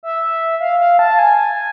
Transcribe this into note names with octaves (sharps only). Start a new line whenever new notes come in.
E5
F5
F5
A5
G#5